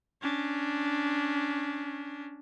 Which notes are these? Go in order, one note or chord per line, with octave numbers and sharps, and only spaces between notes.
C#4 D4